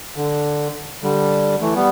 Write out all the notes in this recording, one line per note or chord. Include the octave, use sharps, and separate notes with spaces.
D3
D3 G3
E3 A3
G3 B3